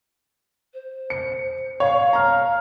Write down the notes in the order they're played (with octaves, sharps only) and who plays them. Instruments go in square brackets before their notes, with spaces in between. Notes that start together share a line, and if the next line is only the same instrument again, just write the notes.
[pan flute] C5
[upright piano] C#7
[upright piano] C#5 [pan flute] F5
[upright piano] A#5 F6